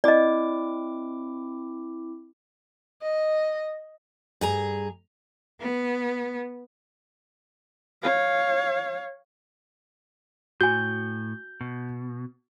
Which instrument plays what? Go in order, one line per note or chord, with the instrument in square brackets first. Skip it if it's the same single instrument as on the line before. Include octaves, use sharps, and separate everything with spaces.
[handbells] C4 E4 D6 [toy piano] D5 D#5
[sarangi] D#5
[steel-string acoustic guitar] G2 G#4 A#5
[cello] B3
[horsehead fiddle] C#5 F5
[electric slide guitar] A2 [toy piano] F#4 G#5 [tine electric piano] G6
[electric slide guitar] B2